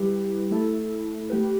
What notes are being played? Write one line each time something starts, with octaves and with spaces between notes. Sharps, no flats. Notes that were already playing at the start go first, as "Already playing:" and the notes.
Already playing: G3 E4 G4 B4
A3 E4 A4
A3 G4 B4